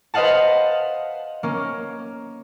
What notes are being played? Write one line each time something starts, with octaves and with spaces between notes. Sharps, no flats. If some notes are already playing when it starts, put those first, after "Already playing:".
B4 C5 D#5 F5 F#5 A5
A#3 C#4